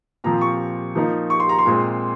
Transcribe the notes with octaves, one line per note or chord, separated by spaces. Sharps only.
A#2 F3 C4 A#5
C#6
F3 A#3 D#4
C#6
C6
A#5
C6
A#2 G#3 C4